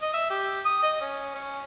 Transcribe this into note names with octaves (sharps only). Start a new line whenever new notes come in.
D#5
E5
G4
D#6
D#5
C#4
C#4